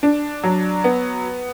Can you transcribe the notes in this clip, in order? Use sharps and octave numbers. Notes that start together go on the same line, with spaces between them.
D4
F#3
B3